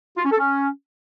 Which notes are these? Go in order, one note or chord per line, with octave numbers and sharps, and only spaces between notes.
F4
C#4
A4
C#4